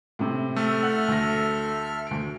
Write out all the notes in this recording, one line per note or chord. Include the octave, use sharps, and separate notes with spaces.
A2 C3
A3 A4 E5 F6
F#5
D2 A#6
D2 D7